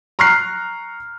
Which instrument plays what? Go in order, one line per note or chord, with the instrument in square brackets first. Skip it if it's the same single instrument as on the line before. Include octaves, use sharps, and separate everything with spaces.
[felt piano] A#5 C#6 F6 F#6 C7